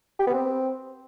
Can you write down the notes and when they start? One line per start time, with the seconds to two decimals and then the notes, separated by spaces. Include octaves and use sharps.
0.19 G4
0.27 B3
0.34 C4